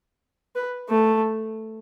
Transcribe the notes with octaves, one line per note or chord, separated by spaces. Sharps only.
B4
A3